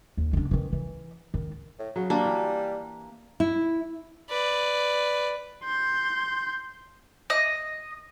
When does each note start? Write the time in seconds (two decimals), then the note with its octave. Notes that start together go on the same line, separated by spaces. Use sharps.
0.17 D#2
0.33 D3 D4
0.51 D#3 E3
0.72 E3
1.34 D#3
1.79 A2
1.96 C#3 F#3
2.10 G3 A#3 D4 C5
2.25 E3
3.40 E4
4.30 B4 D5
5.64 C6 G6
7.30 D#5